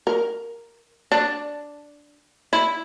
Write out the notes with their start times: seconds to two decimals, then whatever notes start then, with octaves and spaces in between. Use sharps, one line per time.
0.07 A#4
1.12 D4
2.53 E4